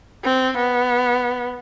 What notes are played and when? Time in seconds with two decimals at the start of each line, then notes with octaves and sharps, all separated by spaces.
0.24 C4
0.57 B3